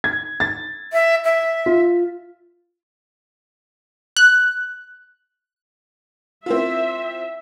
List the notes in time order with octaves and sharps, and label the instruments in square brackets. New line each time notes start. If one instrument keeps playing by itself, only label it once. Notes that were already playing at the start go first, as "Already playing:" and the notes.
[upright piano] G#6
A6
[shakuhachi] E5
E5
[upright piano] F4
[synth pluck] F#6
[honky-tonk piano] C4 E4 F4 [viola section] E5